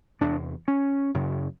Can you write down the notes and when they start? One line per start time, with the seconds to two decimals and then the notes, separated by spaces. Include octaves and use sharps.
0.21 E2 C3 D4
0.68 C#4
1.14 F#2 C#3